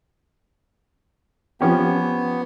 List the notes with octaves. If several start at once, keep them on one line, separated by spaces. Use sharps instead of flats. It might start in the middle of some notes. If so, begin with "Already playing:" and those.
F3 B3 C#4 G4